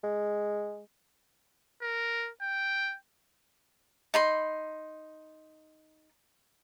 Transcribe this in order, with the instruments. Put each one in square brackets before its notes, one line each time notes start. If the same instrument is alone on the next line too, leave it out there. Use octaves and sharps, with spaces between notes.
[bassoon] G#3
[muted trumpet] A#4
G5
[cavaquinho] D#4 B5 C6